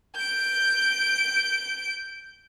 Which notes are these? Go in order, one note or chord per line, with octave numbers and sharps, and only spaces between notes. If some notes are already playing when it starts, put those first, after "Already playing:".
G6 D7